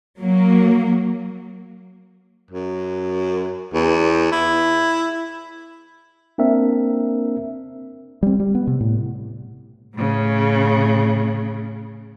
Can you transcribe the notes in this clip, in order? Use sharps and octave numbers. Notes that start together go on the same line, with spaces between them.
F#3 A#3
F#2
E2
E4
A#3 C4 D4 A#4 E5
G3 C4
G3
B3
C3
A2
A2 C#3